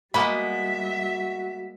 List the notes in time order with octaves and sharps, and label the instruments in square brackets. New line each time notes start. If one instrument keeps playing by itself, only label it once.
[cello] G3 E5 [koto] G#3 A#3 B3 [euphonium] F#4 [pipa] B5